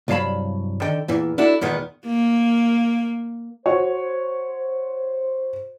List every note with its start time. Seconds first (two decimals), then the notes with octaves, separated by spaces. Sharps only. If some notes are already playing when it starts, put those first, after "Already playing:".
0.08 C2 G2 F#3 F5 A5 B5
0.82 D3 D#3 G5
1.08 E2 A#2 E3
1.38 D4 E4 F#4 A4
1.61 E2 A#2 D#3 G#3 B3
2.07 A#3
3.66 F#4 C5 C#5